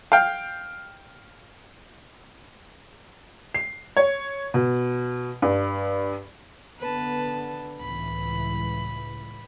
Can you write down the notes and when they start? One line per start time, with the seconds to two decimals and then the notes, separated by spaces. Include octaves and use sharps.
0.12 F5 G5
3.54 C7
3.97 C#5
4.54 B2
5.42 G2
6.79 D3 B3 B4 A5
7.80 C#2 A2 E3 B5